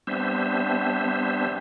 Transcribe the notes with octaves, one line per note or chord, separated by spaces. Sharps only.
G3 B3 C4 D4 C5 E5